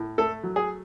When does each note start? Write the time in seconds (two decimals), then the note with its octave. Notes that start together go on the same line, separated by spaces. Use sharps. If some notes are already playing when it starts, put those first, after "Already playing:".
Already playing: A2
0.18 A3 A4
0.43 F#3
0.56 G#4